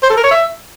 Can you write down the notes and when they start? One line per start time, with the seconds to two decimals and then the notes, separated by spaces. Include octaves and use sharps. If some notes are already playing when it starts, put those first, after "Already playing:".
0.03 C5
0.10 A4
0.17 A#4
0.24 C#5
0.31 E5